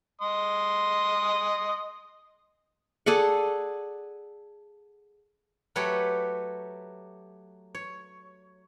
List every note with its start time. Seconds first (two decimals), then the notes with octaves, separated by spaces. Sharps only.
0.21 D#5 C6 D#6
3.06 G#4 A4 D5 F#5
5.76 F#3 A3 G4 B4 C#5 G5
7.75 C#5